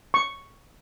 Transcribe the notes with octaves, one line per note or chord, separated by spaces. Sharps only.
C#6